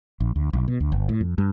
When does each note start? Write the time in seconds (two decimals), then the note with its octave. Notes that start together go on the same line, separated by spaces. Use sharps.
0.20 A#1
0.36 D2
0.53 B1
0.68 B2
0.80 D2
0.92 G1
1.09 A2
1.21 F2
1.38 G2